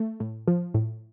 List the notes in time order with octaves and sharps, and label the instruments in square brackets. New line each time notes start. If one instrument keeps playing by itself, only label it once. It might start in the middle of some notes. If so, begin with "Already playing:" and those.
Already playing: [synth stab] A3
A2
F3
A2